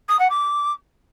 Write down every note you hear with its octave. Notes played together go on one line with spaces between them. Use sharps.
D#6
F#5
D6